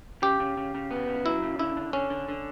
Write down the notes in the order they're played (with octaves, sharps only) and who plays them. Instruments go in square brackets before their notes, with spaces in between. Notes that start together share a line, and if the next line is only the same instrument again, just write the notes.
[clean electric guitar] C#3 [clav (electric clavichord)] G4
[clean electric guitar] C#3
C#3
C#3
B3
C#3
[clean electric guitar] F#3 [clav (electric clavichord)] E4
[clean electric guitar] C#3
[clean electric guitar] D3 [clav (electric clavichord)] E4
[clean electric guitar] D3
[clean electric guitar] D3 [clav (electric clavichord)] C#4
[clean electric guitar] D3
D3